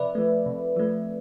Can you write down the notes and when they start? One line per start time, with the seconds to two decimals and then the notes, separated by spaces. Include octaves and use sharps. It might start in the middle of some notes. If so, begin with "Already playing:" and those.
Already playing: C3 F3 B4 D5 E5
0.15 F3 A3
0.46 C3
0.76 F3 A3